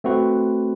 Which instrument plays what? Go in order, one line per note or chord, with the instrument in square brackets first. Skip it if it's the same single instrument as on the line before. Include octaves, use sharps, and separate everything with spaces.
[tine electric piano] A3 C4 F#4 B4